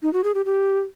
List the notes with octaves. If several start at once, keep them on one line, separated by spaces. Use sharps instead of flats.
D#4
F#4
G#4
G4
G4